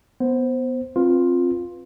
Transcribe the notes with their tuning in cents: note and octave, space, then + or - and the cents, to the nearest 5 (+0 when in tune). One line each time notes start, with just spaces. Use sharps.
B3 +0 C5 +0
C4 +20 F4 +10 B4 +0